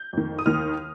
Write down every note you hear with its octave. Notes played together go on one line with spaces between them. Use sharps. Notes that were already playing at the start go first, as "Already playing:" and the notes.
Already playing: G6
F2 D#3
D#6
D#2 D#3 F6